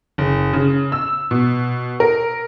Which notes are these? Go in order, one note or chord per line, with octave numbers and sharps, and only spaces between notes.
F#1
C#3
E6
B2
A#4